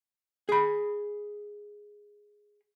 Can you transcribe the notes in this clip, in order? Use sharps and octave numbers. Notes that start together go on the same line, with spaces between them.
G#4 B5